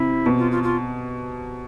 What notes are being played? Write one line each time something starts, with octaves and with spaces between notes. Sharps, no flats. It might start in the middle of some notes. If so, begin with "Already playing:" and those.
Already playing: C3 E4
B2
F4
F4
F4